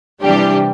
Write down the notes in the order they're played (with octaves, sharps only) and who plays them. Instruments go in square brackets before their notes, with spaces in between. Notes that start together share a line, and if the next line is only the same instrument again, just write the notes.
[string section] C3 E3 G3 D4 G4